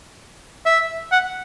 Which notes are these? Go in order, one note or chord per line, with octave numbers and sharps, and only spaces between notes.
E5
F#5